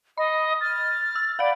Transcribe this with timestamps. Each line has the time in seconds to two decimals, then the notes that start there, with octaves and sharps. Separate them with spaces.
0.18 D#5 B5
0.61 F6 A6
1.16 E6
1.39 D5 F5 F#5 B5 D7